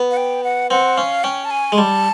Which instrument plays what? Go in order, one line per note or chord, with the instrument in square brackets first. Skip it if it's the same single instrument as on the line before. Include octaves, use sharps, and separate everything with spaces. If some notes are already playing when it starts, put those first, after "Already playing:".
Already playing: [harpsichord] B3
[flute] F#5
G5
F#5
[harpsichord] C4 [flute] F#5
[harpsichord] C#4 [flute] F5
[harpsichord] C#4 [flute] G5
[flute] A5
G#5
[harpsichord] G#3
[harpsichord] G3 [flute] A5